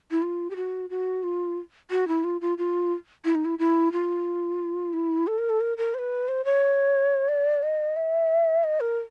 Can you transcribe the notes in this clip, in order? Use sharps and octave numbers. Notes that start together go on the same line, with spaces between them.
E4
F4
G4
F#4
F#4
F4
F#4
E4
F4
F4
F4
E4
D#4
E4
E4
F4
E4
A4
A#4
A4
A#4
A#4
C5
B4
C5
C#5
D5
D#5
E5
D#5
A#4